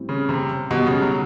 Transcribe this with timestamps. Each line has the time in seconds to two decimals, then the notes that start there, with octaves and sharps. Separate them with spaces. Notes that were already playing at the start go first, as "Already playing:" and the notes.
Already playing: A2 E3 G3 C4
0.09 C#3
0.29 C3
0.71 B2 D#3 G3 B3 D#4 G4
0.87 C#3
1.02 F#3